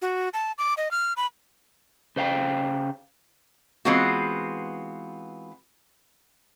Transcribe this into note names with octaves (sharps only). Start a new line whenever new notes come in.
F#4
A5
D6
D#5
F6
B5
C#3 C5 F5 G5
E3 G#3 B3 C4 F4 F#4